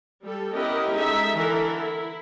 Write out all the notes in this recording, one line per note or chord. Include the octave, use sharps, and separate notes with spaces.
G3 A4
B3 C#4 E4 G4 A#4 D#5
G#3 D#4 A4 E5
D3 E3 E4 A4 A#4
E4